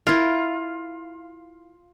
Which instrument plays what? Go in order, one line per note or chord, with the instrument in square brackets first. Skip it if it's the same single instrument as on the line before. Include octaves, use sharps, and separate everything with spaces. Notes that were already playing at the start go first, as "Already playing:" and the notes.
[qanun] E4 A#4 [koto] F4